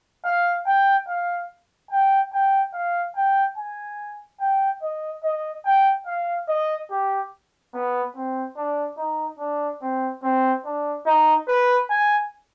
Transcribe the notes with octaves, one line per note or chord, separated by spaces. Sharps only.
F5
G5
F5
G5
G5
F5
G5
G#5
G5
D#5
D#5
G5
F5
D#5
G4
B3
C4
D4
D#4
D4
C4
C4
D4
D#4
B4
G#5